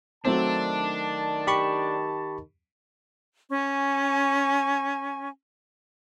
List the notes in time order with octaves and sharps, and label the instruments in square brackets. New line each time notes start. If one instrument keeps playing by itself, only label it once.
[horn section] D#3 A5 [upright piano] F#3 A3 C4 [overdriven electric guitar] D4
[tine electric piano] G4 B5 C#6
[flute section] C#4 G#5 C#6